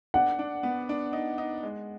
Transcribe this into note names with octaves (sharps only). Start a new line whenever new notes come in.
D4 F#5
D4
B3
D4
D#4
D#4
G#3